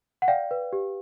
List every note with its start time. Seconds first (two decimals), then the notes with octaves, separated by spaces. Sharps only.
0.22 F#5
0.28 D5 F5 G5
0.51 B4
0.73 G4